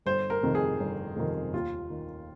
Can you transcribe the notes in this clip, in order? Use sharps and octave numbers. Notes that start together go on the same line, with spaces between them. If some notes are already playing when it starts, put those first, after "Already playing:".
G1 C5
A#4
F2 C3 D#3
G#4
G1
F2 C3 D#3
D#2 F4
D#3